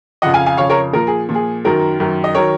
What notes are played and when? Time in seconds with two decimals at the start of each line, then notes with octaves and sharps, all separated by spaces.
0.22 F2 C#3 F3 D#5 F#5
0.34 F5 G#5
0.46 F5 G#5
0.57 F2 C#3 F3 C#5 F5
0.70 A#4 C#5
0.93 A#2 F3 A#4
1.07 G#4
1.29 A#2 F3
1.35 G#4
1.64 F#2 D#3 F#3 A#4
2.00 F#2 D#3 F#3
2.24 D#5
2.35 D#3 F#3 A#4 C#5